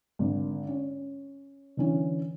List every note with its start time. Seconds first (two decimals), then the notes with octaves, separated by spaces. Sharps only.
0.19 G#1 D3
0.68 C#4
1.77 D3 E3 C#4